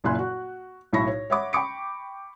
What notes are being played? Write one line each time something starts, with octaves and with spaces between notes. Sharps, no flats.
F#1 A#2 E4 G#5 C6 F#6
F#4
B1 A2 E4 B5 C#6 A#6
C#5
C#5 E5 F#5 B5 C#6 D6
G5 B5 C#6 D6 C#7 D7